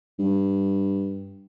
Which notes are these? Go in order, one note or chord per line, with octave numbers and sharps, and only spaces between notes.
G2